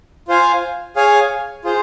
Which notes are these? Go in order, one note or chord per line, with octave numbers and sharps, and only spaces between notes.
F4 C5 F5 G#5
G#4 C#5 F5 G#5
F4 G#4 C5